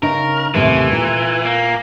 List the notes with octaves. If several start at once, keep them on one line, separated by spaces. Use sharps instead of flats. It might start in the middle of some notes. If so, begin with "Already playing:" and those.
C#3 D#4 A#4
D#2 A2 C3 E3
A#2
A#3